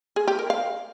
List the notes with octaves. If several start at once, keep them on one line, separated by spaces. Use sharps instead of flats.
G#4
G4
A#4
F5